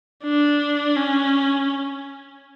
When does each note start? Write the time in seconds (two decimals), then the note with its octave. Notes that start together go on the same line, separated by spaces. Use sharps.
0.23 D4
0.97 C#4